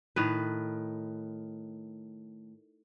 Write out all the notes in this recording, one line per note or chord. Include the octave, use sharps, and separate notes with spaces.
A2 D#3 B4